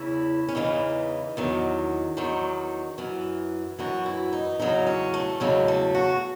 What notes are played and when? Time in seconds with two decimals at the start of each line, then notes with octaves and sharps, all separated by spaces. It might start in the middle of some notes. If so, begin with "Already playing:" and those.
Already playing: E2 C#3 E3 E4
0.48 C#4
0.55 E2 C#3 E3 D#4
1.37 E2 D#3 F#3
2.17 E2 D#3 F#3
2.98 F#2 E3
3.79 F#2 E3 F#4
4.06 E4
4.33 D#4
4.59 E2 C#3 F#3 D#4
4.86 C#4
5.14 A3
5.40 E2 C#3 F#3 G#3
5.68 A3
5.95 F#4